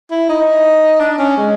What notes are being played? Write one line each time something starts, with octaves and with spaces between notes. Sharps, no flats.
E4
D#4
D4
C#4
G#3